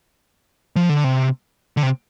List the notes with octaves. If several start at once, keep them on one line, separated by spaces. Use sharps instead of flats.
F3
D3
C3
D3
C3